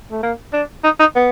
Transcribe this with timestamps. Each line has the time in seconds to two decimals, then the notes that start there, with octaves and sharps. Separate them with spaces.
0.11 A3
0.23 A#3
0.53 D4
0.84 D#4
1.00 D#4
1.15 B3